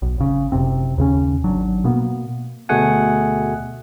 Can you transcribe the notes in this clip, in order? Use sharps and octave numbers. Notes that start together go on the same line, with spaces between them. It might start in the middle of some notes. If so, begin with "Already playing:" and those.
B1
G#1 C#3
F#1 C3 C4
D#2 C#3 C#4
G#1 F#3 D4
B2 A#3 B3
D2 B2 A3 G#4 F#5 G#5